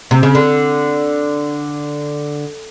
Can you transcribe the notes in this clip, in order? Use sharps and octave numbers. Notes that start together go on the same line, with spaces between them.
C3
C#3
D3